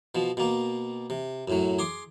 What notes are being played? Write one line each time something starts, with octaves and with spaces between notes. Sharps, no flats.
B2 F3
B2 A#3
C3
F#2 A2 F#3
G#4 C6 D6